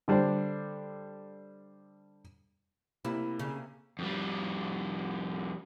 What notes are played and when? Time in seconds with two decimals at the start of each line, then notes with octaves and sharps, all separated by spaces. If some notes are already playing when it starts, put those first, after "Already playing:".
0.08 D3 G3 D4 C5
3.05 C3 A#3 E4
3.39 C#3
3.99 F2 G3